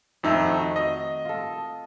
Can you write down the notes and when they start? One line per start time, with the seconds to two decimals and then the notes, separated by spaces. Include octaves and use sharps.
0.23 F2 D#3 A3 C4 D#4 E6
0.45 F#4
0.76 D#5
1.25 F4 A4